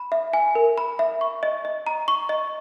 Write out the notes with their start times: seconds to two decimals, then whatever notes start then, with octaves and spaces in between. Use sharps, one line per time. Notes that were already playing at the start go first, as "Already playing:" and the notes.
Already playing: B5
0.12 E5
0.33 G#5
0.55 A#4
0.78 B5
0.99 E5
1.21 C#6
1.43 D#5
1.65 D#5
1.87 A#5
2.08 C#6
2.29 D#5